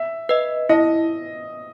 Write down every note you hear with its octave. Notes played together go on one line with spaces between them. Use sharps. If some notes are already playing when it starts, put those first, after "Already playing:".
Already playing: E5
B4 D#5
E4 D#5